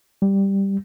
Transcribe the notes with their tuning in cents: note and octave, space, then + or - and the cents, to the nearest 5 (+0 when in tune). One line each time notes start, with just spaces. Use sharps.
G3 +0